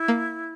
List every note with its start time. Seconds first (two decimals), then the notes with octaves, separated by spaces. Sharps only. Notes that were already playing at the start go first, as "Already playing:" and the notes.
Already playing: E4
0.08 A#3